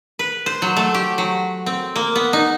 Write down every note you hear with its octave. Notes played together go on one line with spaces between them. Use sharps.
B4
C5
F#3
A3
G4
F#3
C4
A#3
B3
D#4